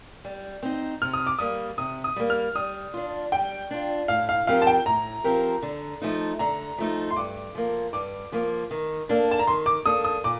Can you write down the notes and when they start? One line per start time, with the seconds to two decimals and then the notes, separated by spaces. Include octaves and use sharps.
0.25 G3
0.63 C4 D#4
1.02 C3 F6
1.14 D#6
1.27 D6
1.39 G3 A#3 D#6
1.78 C3 D#6
2.04 D#6
2.16 G3 A#3
2.30 F6
2.55 G3 D#6
2.94 D4 F4
3.32 G3 G5
3.71 D4 F4
4.08 A2 F5
4.29 F5
4.47 F3 C4 G4 A#4 F5
4.62 A5
4.67 G5
4.86 A2 A#5
5.24 F3 C4 G4 A#4
5.62 D3
6.02 F3 A3 D#4
6.39 D3 A#5
6.78 F3 A3 D#4
7.10 C6
7.16 G2 D6
7.55 F3 A#3
7.93 G2 D6
8.32 F3 A#3
8.71 D#3
9.09 A#3 D4 A4
9.31 A5
9.39 A#5
9.47 D#3 C6
9.66 D6
9.86 A#3 D4 A4 D#6
10.05 D#6
10.24 A#2 D6